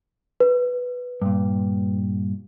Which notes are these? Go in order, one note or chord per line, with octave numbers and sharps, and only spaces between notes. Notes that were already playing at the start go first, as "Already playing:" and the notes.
B4
G2 A#2